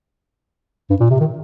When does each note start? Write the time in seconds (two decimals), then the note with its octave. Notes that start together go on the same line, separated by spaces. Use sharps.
0.90 G2
1.00 A#2
1.10 C3
1.20 D#3